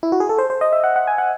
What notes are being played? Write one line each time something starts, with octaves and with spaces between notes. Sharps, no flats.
E4
F#4
G#4
A4
C5
C5
D#5
E5
F#5
F#5
G#5
F#5